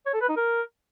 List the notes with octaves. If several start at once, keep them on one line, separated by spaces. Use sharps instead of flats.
C#5
A4
B4
D#4
A#4